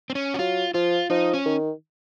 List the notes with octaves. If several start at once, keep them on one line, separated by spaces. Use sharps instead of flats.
C4
C#4
F#4
F#3 F4
F3 F4
F3 D#4
C#4
D#3